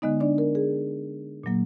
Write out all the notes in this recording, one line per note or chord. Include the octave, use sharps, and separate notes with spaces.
D3 G#3 B3 D#4 D#5
D4 D5
A#4
G#4
A#2 F#3 A#3